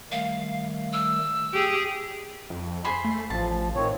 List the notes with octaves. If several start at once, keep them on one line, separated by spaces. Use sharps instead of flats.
D#3 G3 A3 F5
E6
G4 G#4
F2
G#4 C5 B5
A3
A1 F3 A5
A2 D#3 C4 C#5